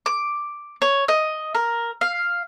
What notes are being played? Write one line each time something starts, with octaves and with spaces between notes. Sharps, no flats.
D6
C#5
D#5
A#4
F5